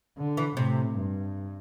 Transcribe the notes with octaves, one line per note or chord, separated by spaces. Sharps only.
D3
E3
A2 C3
G2